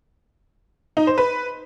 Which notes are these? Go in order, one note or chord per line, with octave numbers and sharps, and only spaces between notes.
D#4
C5
B4